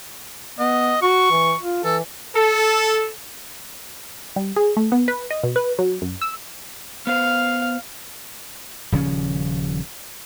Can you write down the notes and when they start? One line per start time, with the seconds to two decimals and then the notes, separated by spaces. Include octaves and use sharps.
0.59 B3 D#5
1.02 F#4 C#6
1.31 E3
1.62 F4
1.84 E3 A4
2.35 A4
4.36 G3
4.56 G#4
4.77 A3
4.92 B3
5.08 B4
5.31 D#5
5.43 B2
5.56 B4
5.79 F#3
6.02 F#2
6.21 E6
7.07 B3 C5 F5
8.92 D#1 C#3 F3 C#4